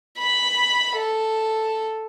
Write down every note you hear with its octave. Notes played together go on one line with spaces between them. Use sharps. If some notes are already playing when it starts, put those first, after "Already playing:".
B5
A4